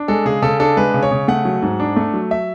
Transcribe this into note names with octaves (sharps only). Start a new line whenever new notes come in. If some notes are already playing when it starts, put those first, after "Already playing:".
Already playing: D4
G#3 A4
C#3 G#4
C#3 A4
D4 A4
G#3 B4
C#3
C#5
C#3
A3 F#5
F#3
G#2
D4
A3
F#3
E5